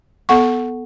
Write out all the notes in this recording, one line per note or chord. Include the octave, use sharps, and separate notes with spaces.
B3 A4 F#5 C#6